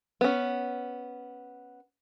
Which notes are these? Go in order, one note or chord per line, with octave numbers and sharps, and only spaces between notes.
B3 C#4